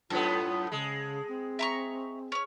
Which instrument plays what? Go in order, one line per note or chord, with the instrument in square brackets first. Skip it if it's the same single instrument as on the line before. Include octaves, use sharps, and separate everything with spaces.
[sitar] F#2 A2 B3 [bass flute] F4 [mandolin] A4
[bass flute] C#3 [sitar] G#3
[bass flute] C4
[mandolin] E5 A#5 C#6
C#4 C#5